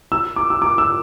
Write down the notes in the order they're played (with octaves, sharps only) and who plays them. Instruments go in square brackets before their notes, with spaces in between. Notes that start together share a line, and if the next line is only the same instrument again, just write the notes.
[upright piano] E6
D6
E6
D6
E6